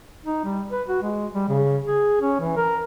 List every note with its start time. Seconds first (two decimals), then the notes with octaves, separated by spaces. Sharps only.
0.25 D#4
0.44 G3
0.71 B4
0.88 F#4
1.03 G#3
1.33 G3
1.49 C#3
1.87 G#4
2.21 C#4
2.40 E3
2.57 A#4